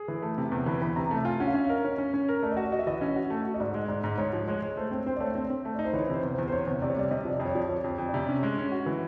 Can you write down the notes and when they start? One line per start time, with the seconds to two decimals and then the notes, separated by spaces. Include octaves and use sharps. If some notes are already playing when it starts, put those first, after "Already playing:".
Already playing: G#4
0.08 E3
0.22 A3
0.38 C3
0.52 E2
0.66 E3 B5
0.82 E2 B5
0.96 C3 A#5
1.11 A3 A5
1.25 F4 G#5
1.40 C#4 F#5
1.48 F5
1.54 C#4 E5
1.69 A#4 D#5
1.84 C#4 C#5
1.98 C#4
2.14 C#4
2.29 A#4
2.42 A3 D5
2.52 D#5
2.57 F#4 D5
2.72 F#4 D#5
2.79 E5
2.87 E3 D#5
3.01 C#4 E5
3.16 F#4
3.30 A3
3.45 F#4
3.54 D#5
3.60 G#2 D5
3.74 G#3
3.88 G#2 D5
4.04 G#2
4.18 G#2 C#5
4.33 F3
4.47 G#3 C#5
4.62 G#3
4.77 A3 C5
4.91 C4 C#5
5.06 C4 C5
5.16 D5
5.20 A3 C#5
5.35 C4 C#5
5.50 C4
5.65 A3
5.75 D5
5.79 D#4
5.85 C5
5.93 E3 C#5
6.09 C3 C5
6.23 E2
6.33 C5
6.38 E2
6.48 C5
6.52 C3 C#5
6.67 E2
6.82 C3 D5
6.90 C#5
6.97 G3 D5
7.11 C3 D#5
7.25 F3
7.30 D5
7.40 F2
7.45 C#5
7.50 D5
7.55 F3
7.69 F2 C#5
7.84 F2 C#5
7.98 F2
8.09 D5
8.14 C3
8.29 C#4
8.43 G#3
8.58 C#4
8.72 F#4
8.86 E3